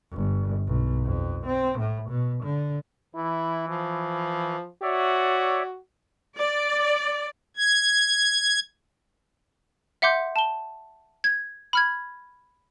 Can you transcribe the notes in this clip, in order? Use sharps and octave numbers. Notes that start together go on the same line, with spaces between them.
G1
B1
F2
C4
A2
B2
D3
E3 E4
F3
F#4 C#5 D5 E5
D5
G#6
E5 F#5 C6 D6 G6
A5 G7
G#6
B5 F6 G#6